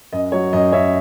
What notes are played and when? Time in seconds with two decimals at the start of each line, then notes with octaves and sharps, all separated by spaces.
0.13 F#2 D#5
0.32 F#3 C#5
0.53 F#2 D#5
0.72 F#2 C#5 E5